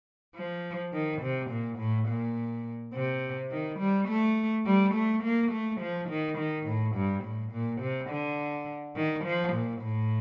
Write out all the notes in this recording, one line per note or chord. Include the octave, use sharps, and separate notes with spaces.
F3
D#3
C3
A#2
A2
A#2
C3
D#3
G3
A3
G3
A3
A#3
A3
F3
D#3
D#3
A2
G2
A2
A#2
C3
D3
D#3
F3
A#2
A2